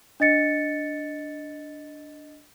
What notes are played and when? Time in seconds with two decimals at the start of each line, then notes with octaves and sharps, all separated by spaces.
0.20 D4 D#5 A6 C#7